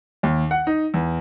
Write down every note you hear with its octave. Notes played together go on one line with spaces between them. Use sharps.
D#2
F#5
D#4
E2